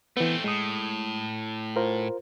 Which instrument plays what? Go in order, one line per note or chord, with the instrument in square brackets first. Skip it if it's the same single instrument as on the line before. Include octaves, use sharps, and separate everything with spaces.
[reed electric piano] E3 B3 [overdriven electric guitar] A3 C4
[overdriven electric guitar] A2 [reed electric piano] G#3 D#6
[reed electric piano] F4 A#4 C5